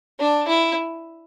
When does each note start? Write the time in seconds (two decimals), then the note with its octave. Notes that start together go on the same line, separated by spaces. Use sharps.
0.20 D4
0.48 E4